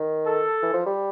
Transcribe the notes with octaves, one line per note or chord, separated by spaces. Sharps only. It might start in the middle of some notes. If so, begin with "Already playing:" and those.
Already playing: D#3
A4
E3
F3
G3